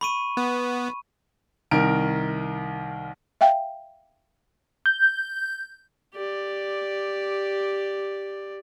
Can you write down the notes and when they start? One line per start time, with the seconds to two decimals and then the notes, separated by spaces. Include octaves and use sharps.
0.01 B5 C#6 D#7
0.37 B3
1.71 C2 D#3 A#4 D7
3.41 E5 F5 G5
4.86 G6
6.13 G4 D5